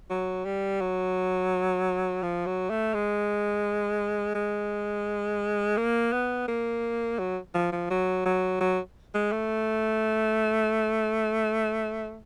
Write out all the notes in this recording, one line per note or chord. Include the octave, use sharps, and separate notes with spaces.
F#3
G3
F#3
F3
F#3
A3
G#3
G#3
A#3
B3
A#3
F#3
F3
F3
F#3
F#3
F#3
G#3
A3